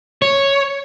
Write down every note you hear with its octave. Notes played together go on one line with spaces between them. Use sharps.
C#5